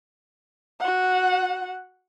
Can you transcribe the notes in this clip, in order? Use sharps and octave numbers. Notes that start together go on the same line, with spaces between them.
F#4 F#5